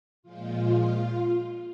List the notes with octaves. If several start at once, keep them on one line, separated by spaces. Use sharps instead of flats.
A#2 F3 G#3 F4